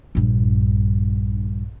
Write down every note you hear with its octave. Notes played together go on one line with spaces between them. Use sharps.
A#1 G2